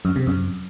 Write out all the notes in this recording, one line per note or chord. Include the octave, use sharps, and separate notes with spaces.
F#2
C3
F#2